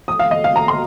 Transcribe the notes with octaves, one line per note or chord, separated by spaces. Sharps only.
D#6
F5
D#5
F5
A#5
C6